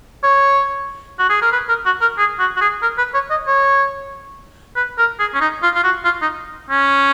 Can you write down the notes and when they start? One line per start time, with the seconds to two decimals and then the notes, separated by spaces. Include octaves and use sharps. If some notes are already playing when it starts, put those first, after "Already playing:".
0.23 C#5
1.19 F#4
1.30 G#4
1.42 A#4
1.52 B4
1.69 A#4
1.86 F#4
2.01 A#4
2.18 G#4
2.39 F#4
2.56 F#4
2.61 G#4
2.82 A#4
2.98 B4
3.14 C#5
3.30 D#5
3.47 C#5
4.76 B4
4.98 A#4
5.19 G#4
5.34 C#4
5.41 D#4
5.62 F4
5.75 F4
5.83 F#4
6.05 F4
6.22 D#4
6.70 C#4